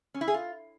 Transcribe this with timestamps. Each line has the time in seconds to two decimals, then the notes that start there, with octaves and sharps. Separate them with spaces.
0.14 C#4
0.21 E4
0.28 G#4
0.34 F4